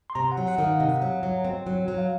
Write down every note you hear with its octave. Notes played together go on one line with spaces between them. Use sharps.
C6
C3 A#5
F#5
F#3
F#5
D#3
F5
C3 D#5
F#3
F#3
C4
F#3
F#3
F5